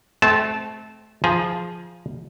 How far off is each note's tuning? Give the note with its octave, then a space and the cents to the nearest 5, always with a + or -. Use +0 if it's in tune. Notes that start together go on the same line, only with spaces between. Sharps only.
A3 -25 C4 +0 A5 -15
F3 +0 G#4 +0 A#5 +35